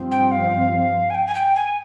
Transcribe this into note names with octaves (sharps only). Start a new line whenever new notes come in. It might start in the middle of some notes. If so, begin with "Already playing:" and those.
Already playing: G2 F3 C4
G5
F5
G#5
G5
G#5
G5
G#5